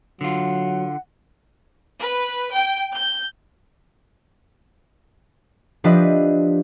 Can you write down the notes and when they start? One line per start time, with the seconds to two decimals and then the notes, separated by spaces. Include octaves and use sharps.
0.21 D3 F#3 F4 F#5
2.01 B4
2.55 G5
2.94 G6
5.84 F3 D4 G4 B4 D#5 E5